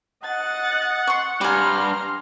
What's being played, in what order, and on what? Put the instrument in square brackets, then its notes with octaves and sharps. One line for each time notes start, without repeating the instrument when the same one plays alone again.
[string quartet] D#5 F#6 A6 [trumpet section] F#5
[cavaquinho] C6 C#6
[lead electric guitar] G2 G3 [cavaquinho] G4 G#5 [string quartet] A#5 C6 F6